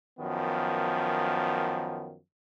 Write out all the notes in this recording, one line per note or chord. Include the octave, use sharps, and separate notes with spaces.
F#2 D#3 F3 B3